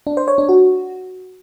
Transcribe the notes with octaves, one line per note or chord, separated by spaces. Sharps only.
D4
C5
C#5
D4
F#4